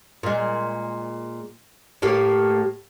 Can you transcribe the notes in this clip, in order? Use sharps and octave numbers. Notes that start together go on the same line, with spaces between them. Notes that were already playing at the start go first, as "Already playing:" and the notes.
A#2 G#3
A2 A#3 G4